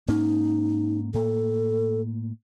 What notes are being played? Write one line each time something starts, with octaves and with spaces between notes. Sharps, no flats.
G#2 A#3 C#4 D#4
A2 A#3 A4